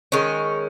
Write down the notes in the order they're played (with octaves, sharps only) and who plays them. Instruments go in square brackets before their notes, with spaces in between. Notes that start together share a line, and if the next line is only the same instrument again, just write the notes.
[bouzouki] D#3 G#3 C#4